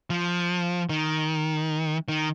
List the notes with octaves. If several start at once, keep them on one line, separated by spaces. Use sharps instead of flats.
F3
D#3
D#3